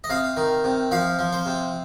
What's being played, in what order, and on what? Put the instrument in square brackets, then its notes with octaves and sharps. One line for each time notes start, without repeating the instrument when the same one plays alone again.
[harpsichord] D#5
C3 F5
D#3
C3
F3 F5
F3
C5
C3